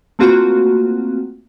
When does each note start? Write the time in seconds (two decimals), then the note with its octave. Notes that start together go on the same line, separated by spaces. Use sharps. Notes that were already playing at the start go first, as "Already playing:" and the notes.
0.19 A3 A#3 C4 F4 F#4